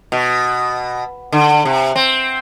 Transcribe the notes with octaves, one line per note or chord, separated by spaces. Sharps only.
B2
D3
C3
C4